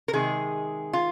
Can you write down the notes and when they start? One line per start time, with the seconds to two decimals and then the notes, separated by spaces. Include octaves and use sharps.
0.08 A#4
0.13 C3 D#3 G#3 G#4
0.93 F4